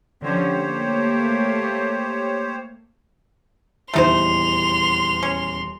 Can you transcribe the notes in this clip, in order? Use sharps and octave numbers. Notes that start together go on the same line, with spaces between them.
D3 F3 C#4 G4 C5 C#5
A3 A#3
D#1 E2 A3 D#4 C5 A#5 C6 F7
C#4